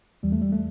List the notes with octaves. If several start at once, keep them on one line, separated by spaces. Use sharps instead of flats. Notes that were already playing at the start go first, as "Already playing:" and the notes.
E2 E3 G3
A3
G3
A3